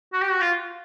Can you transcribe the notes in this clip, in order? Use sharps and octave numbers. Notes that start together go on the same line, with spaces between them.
F#4
G4
F#4
F4